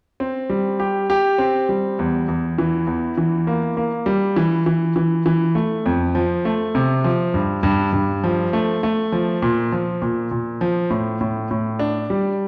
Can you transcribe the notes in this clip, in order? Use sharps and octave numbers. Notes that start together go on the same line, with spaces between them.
C4
G3
G4
G4
C4
G3
E2
E2
E3
E2
E3
A#3
A#3
G3
E3
E3
E3
E3
A3
F2
F3
A3
C3
F3
G2
G2
G2
F3
A3
A3
F3
A#2
F3
A#2
A#2
F3
A2
A2
A2
D4
G3